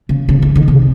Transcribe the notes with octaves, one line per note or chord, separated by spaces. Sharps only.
C#3
C#3
E3
D#3
C3